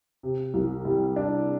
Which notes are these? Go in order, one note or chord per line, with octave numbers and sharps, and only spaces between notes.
C3
C2
G3
D4